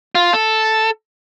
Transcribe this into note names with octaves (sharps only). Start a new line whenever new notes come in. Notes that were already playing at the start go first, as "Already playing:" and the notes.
F4
A4